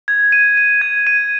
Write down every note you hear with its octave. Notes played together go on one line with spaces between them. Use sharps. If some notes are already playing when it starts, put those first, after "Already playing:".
G#6
D#7
D#7
G#6
D#7